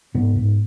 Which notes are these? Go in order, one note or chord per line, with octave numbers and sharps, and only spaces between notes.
G#2 B3
G#2